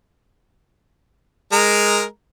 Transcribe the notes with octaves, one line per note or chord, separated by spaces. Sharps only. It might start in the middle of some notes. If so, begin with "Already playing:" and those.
G#3 A#4 A#5